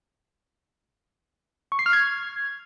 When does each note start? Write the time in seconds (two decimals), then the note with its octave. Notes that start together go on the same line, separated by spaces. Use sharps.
1.72 C#6
1.79 C7
1.86 F6
1.93 G#6